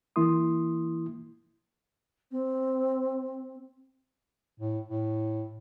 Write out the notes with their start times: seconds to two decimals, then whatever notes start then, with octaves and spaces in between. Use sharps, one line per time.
0.16 E3 A#3 E4 C6 D#6
2.31 C4
4.58 A2
4.88 A2